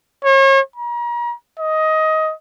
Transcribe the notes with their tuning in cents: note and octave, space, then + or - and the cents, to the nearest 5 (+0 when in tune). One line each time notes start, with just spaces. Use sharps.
C#5 -40
A#5 +40
D#5 +15